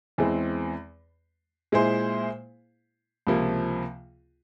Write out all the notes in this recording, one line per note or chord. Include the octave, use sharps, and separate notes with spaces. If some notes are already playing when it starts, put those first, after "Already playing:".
E2 E3 G#3 C4
A#2 G#3 E4 G#4 C5
C#2 C3 F3 A#3